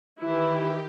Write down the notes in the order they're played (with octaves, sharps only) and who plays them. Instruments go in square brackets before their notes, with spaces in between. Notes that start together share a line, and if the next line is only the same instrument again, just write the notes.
[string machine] D#3 G4 [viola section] E3 E4